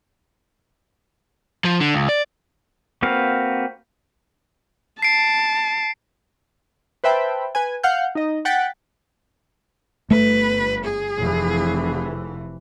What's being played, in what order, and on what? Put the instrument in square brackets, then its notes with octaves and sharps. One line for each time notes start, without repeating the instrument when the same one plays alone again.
[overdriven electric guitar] F3
D3
C#2
D5
[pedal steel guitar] A#3 C4 F#4 B4 F5
[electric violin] A5 [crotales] C7 D7
[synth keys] B4 C5 E5 G5 A5 B5
B4 G#5
F5 F#5 F6 G6
D#4 D#5
F#5 G5 F#6 A6 B6
[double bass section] G1 [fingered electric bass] A3 [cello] B4
[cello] G#4
[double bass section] F1 E3